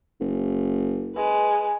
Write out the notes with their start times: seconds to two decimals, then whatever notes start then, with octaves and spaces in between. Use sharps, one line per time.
0.20 F#1
1.15 G#3 B4